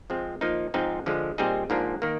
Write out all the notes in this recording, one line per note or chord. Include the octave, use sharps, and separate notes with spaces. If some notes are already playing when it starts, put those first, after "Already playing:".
F3 G#3 C4
F3 A#3 D#4
G#2 F3 C4 D#4
D3 F3 G#3
A#2 G3 C4 D#4 G#4
G#2 F3 A#3 D4
D#3 A#3